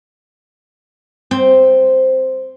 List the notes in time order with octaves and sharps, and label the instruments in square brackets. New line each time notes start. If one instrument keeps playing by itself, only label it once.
[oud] C4